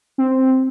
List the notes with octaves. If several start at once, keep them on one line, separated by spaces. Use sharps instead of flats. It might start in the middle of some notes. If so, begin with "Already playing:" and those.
C4